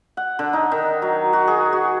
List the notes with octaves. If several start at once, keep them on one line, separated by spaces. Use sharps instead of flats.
F#5
D3
D#4
D#3
F#3
F#4
G#4
F#4